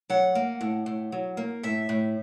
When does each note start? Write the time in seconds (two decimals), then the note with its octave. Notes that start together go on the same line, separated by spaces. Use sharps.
0.10 F#3 F#5
0.35 A#3
0.61 A2
0.86 A2
1.12 F#3
1.37 A#3
1.63 A2 E5
1.89 A2